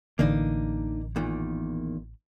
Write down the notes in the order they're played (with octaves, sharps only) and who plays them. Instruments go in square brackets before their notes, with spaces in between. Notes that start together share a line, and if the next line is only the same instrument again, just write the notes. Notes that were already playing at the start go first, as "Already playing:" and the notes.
[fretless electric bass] A1 D3 E3 [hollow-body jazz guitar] A#3 D4 D#4
[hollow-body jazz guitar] E2 A#2 D#3